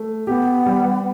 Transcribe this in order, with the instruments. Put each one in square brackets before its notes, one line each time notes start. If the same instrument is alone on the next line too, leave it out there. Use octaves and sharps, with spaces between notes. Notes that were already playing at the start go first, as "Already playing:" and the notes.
Already playing: [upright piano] A3
[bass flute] B3 [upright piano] G4
[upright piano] G3